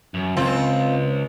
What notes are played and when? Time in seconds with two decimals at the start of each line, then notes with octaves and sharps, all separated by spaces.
0.14 F#2
0.36 C#2 C4 F4